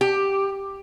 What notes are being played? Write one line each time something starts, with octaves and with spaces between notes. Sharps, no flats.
G4